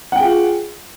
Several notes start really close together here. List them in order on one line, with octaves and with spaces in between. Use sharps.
F#5 G5 G#4 F4